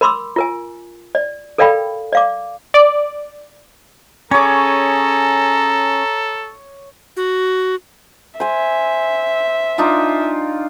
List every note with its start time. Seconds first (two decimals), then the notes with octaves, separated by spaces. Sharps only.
0.01 A#4 B5 C6 D6 E6
0.36 F4 A#4 G#5
1.15 D5
1.58 A4 A#4 D5 F5 G5 B5
2.13 D5 F5 D6
2.74 D5
4.31 C#4 G#4 A4 C#5 A#5 D6
7.16 F#4
8.40 C5 E5 G#5
9.78 D4 D#4 F4